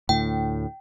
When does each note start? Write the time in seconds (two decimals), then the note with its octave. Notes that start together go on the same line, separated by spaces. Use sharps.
0.09 D2 A2 G5